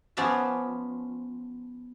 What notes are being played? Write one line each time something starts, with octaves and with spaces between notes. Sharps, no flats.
F3 B3 C#4 D5 E5